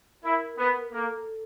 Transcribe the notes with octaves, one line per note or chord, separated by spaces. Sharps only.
E4 A#4
B3 A#4
A#4
A#3 A4